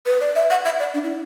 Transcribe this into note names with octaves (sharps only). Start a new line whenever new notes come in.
B4
D5
E5
F#5
E5
D5
D4
E4